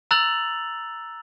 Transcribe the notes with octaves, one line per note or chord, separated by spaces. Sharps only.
A#5 E6 F#6 A6 F7 F#7